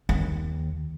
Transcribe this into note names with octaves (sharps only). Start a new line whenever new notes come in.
D#2